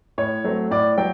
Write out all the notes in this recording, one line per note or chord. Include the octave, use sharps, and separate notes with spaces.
A2 C#5
F#3 A3 C4
A2 D5
F#3 G5